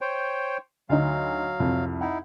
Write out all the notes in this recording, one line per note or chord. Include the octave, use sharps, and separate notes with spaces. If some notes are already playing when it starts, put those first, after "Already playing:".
C5 C#5 G5
D2 F#3 D#4 F5
C2 F2
D#4 E4 F#5